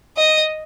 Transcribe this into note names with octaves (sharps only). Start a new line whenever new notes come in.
D#5